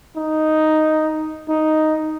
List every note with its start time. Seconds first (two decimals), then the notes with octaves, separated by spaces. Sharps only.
0.17 D#4
1.49 D#4